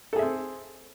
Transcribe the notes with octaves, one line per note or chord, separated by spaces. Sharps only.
C4 G#4 A4 E5